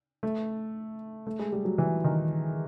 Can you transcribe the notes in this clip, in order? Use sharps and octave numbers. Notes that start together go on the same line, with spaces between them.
A3
A3
G#3
G3
F#3
E3
D#3